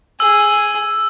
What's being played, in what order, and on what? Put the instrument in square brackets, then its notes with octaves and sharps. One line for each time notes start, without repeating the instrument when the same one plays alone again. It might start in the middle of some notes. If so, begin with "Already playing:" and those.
[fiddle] G#4 [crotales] E6